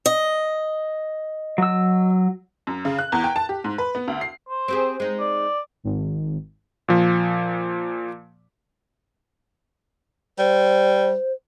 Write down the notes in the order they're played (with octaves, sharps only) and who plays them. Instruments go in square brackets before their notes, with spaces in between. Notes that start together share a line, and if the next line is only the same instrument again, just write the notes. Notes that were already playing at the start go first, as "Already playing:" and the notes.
[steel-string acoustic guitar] D#5
[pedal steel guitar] F#3 E6
[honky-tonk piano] F#2
C#3
F#6
E2
G5
A5
G4
G#2
B4
B3
D2
C7
[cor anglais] C5
[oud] C4 G4 G#4
G#3 D#4
[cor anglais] D5
[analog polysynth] G#1
[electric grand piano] A#2 F3
[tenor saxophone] G3 [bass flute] C5